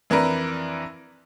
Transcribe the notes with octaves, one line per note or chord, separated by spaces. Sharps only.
F2 E3 D4 A#4 B4